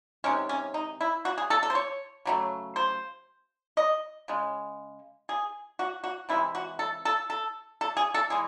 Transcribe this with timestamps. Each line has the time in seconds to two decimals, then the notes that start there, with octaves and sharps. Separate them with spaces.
0.24 C3 D#3 G#3 C#4
0.49 C#4
0.74 D#4
1.01 E4
1.25 F#4
1.38 G#4
1.50 A4
1.63 A4
1.70 C5
1.75 C#5
2.25 C#3 F#3 A3
2.76 C5
3.77 D#5
4.28 C#3 G#3
5.29 G#4
5.79 F#4
6.04 F#4
6.29 C3 E3 G#3 E4
6.55 F#4
6.79 A4
7.05 A4
7.30 A4
7.81 A4
7.97 G#4
8.14 A4
8.30 E3 G#3 G#4